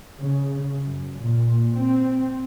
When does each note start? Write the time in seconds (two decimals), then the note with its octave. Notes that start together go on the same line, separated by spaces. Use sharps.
0.19 C#3
0.85 F#2
1.17 A#2
1.76 C4